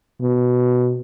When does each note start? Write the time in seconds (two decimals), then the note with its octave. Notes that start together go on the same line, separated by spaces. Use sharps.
0.22 B2